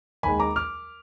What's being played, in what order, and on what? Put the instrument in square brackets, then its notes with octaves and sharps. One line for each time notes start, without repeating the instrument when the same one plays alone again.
[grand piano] D#2 D#3 G#3 G#5 B5
A#5 D6
D6 F6